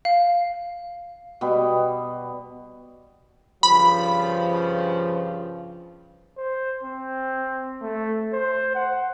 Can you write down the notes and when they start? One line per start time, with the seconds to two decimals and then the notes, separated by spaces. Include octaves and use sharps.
0.05 F5
1.41 B2 G3 B3
3.63 G2 C#3 F3 B5
6.38 C5
6.83 C4
7.81 A3
8.33 C5
8.75 F#5